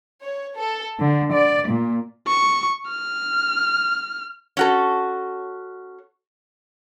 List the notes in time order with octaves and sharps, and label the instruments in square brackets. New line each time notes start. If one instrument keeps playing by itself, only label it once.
[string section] C#5
A4
D3
D5
A#2
[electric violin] C#6
F6
[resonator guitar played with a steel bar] C#4 F#4 A4